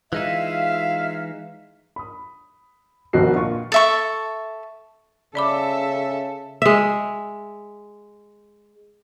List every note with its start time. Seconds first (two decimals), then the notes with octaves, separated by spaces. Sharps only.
0.13 E3 G#3 D#4 F4 E5 F5
1.96 B5 D#6
3.13 F1 C2 B2 D#3 F#4 C7
3.35 A#2 F4 C#6
3.72 A4 E5 C#6
5.35 C#3 A4 D5 E5 B5 D6
6.62 G#3 E5